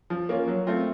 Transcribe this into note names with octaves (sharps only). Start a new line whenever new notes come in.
F3
A#3 C#4 F4
F#3
A3 C4 F4